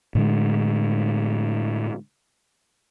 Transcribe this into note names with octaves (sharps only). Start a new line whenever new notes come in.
A2 D3 G#3